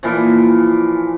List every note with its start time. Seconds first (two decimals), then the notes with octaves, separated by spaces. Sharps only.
0.03 A#2 E3 F3